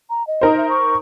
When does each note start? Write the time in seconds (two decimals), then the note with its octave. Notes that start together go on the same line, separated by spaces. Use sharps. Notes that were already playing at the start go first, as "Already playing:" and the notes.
0.10 A#5
0.27 D#5
0.41 D#4 A#4 C5
0.57 E5
0.70 C#6